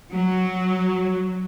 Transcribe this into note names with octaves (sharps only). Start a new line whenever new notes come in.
F#3